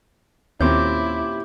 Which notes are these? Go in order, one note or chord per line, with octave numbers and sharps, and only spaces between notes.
D#2 A#2 C4 C#4 E4 G4 D6 G6